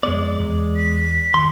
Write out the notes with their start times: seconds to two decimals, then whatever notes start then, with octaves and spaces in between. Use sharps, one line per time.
0.03 F2 G#3 B3 D5
0.39 E2
0.77 B6
1.34 G2 D#3 C6